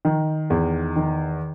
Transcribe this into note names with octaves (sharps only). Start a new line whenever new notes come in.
D#3
E2
D#3